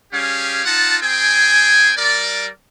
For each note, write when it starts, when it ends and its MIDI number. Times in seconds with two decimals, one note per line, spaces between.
0.12 0.64 55
0.12 0.64 61
0.12 0.64 67
0.12 0.64 68
0.12 0.64 77
0.65 0.97 63
0.65 0.97 65
0.65 0.97 78
0.65 0.97 81
1.02 1.91 60
1.02 1.91 68
1.02 1.91 79
1.02 1.91 80
1.97 2.47 55
1.97 2.47 70
1.97 2.47 74